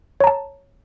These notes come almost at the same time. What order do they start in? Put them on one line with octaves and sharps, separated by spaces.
C#5 A#5 A5